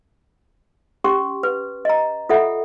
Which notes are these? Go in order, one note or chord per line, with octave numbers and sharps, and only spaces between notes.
C#4 G4 C6 C#6
B4
D#5 A#5
F4 A4 E5 F#5